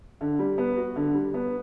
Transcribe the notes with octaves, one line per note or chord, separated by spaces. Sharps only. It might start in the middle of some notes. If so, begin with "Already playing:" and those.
D3
G3
B3
F#4
D3
G3
B3